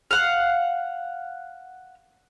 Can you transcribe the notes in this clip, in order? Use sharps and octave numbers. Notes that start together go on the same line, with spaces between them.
F5 F#5